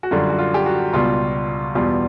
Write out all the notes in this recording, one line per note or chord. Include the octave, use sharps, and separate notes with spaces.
F#4
F#2 D3 G3 F4
F#4
F4
G4
F#4
C#2 B2 G3 F4
E2 B2 G3 F4